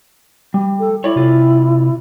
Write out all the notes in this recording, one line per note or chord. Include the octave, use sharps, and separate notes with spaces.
G3
A4
E4 C#5 D5
C3 F4